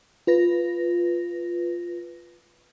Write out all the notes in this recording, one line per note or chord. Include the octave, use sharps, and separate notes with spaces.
F4 B4 A#6